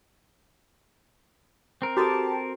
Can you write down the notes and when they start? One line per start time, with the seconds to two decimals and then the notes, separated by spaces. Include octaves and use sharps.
1.82 C4 A#4
1.97 F#4 G4 A4 A5